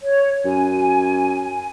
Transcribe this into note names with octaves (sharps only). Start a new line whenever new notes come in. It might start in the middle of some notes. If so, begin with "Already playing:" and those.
C#5
F#2 G#5